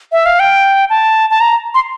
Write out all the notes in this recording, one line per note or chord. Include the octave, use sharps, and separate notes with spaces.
E5
F5
G5
A5
A5
A#5
C6